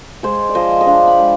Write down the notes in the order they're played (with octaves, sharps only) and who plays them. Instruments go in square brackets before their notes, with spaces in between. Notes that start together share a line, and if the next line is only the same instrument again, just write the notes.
[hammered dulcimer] G#3 G#4 C5
D5
F3 C5 D#5
D#5
D4 D5 F5
G5 B5
G#3